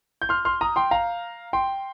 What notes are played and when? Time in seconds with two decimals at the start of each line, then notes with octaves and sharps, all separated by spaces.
0.22 G6
0.29 C6 F6
0.45 C6 F6
0.61 A#5 D#6
0.76 G5 C6
0.91 F5 A#5
1.53 G5 C6